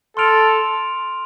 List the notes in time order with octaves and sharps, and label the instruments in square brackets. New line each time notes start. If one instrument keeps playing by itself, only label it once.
[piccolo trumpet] A4 [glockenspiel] C6 F6 D7 F7